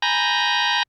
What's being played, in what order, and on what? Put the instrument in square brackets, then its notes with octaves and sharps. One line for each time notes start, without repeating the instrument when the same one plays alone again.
[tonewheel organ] G#5 A#5 B5 G6 A#6